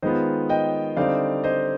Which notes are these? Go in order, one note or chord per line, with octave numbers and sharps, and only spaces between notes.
D#3 G#3 B3 F4 C5 D#5
D#5 G5
D3 G3 C4 D#4 D5 F5
C5 D#5